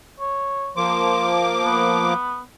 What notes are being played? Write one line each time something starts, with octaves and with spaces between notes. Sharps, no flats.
C#5
F3 A#3 C5 D6
B3